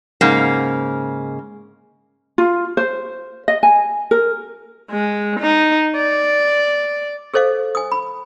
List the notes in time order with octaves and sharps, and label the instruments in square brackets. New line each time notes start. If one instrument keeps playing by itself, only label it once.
[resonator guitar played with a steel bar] G#2 C#3 A#3
[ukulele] F4
C5
D#5
G#5
A#4
[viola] G#3
D#4
D5
[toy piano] G#4 A4 C5 D#5 F5
G#5 D#6
B5